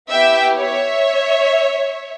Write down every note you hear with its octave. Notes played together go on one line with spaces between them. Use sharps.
B3 E4 G4 E5 G5
C#5 E5